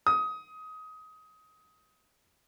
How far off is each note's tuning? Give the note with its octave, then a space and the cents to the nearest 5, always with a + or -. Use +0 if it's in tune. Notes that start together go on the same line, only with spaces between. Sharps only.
D#6 +20